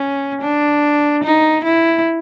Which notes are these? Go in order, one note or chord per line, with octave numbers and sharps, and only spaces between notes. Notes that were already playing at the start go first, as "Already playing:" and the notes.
Already playing: C#4
D4
D#4
E4